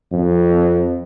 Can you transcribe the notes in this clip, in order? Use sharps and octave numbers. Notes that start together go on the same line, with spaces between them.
F2